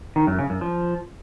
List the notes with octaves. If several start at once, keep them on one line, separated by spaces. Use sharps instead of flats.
D#3
F#2
C#3
F#2
F3